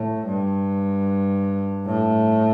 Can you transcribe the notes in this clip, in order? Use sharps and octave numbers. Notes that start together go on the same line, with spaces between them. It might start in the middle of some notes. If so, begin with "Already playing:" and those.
Already playing: A2
G2
A2